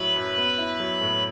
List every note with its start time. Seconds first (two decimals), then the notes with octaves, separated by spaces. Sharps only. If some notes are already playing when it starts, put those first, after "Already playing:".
Already playing: A2 F#3 E4 B4
0.16 F#2
0.37 B3
0.58 E4
0.80 F#3
1.01 A2